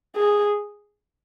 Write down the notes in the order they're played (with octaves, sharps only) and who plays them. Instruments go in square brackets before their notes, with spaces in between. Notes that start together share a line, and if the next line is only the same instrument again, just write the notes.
[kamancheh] G#4